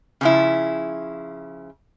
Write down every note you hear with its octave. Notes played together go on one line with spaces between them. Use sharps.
C#3 F3 E4